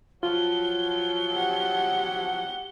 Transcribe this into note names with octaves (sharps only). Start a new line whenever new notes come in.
F3 F#3 F4 G7
G4 F#5